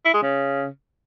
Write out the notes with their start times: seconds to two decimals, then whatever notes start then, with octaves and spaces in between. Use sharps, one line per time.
0.05 E4
0.14 G#3
0.23 C#3